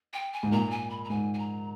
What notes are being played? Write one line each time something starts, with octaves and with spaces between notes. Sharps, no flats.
G5
G#5
G#2
A#2 A#5
G#5
B5
A#5
G#2 G#5
G#5
A#5